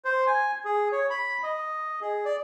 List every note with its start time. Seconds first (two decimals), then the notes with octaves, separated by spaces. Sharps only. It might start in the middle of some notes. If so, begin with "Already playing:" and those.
0.05 C5
0.27 G#5
0.65 G#4
0.92 C#5
1.10 B5
1.43 D#5
2.01 G#4
2.25 D5